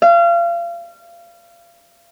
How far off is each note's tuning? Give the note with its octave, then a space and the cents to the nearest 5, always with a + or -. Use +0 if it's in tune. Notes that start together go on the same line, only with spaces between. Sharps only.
F5 -30